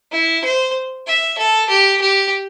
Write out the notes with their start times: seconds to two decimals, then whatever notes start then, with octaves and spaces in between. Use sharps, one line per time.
0.12 E4
0.44 C5
1.07 E5
1.38 A4
1.69 G4
2.01 G4